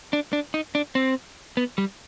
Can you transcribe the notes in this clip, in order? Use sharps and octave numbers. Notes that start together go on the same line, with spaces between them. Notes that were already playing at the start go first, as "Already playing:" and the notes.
D4
D4
D#4
D4
C4
B3
G3